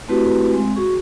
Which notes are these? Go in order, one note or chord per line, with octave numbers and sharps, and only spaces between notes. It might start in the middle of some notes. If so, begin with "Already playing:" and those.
A3 C4 E4 F#4 G4 B4
G#3 C4
F#4 G#4 C#6